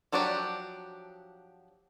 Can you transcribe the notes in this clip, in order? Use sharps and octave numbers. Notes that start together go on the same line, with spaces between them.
F3 F#3 D4 F#4 G4